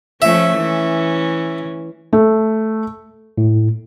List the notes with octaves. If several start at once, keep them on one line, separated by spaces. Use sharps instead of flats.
F3 A3 C#4 E5
E3 C#4
A3
A2